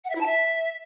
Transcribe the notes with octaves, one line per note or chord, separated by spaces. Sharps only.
F#5
E5
E4
A5
E5